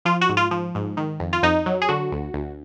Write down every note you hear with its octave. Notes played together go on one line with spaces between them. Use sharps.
F3 F4
F#4
G#2
F4
F3
G#2
D#3
F2
F4
F2 D#4
F#3
G#4
D3 F#4
D2
D2